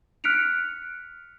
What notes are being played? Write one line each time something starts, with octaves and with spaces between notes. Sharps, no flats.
F6 F#6 B6 C#7 D7 F7